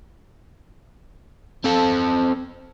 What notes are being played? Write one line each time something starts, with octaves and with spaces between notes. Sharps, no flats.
C4 A4